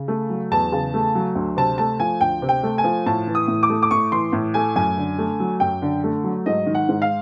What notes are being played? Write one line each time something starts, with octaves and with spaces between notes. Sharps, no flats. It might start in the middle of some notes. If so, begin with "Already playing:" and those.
Already playing: C#3
A3
F#3
E2 A5
C#3
A3
F#3
D2
C3 A5
A3 A5
F3 G#5
D2 G5
C3
G5
A3
G#5
F3
A2 A5
E3
D#6
A2
D6
A3
D6
A2 C#6
E3 C6
A2
A3 G#5
F#2 G#5
D3
A3
F#3
F#2 G5
D3
A3
F#3
G#2 D#5
D#3
F#5
G#2
F5